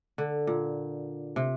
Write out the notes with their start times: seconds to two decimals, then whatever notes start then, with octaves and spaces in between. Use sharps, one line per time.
0.18 D3
0.47 A#2
1.36 C3